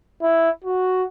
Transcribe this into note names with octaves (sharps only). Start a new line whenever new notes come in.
E4
F#4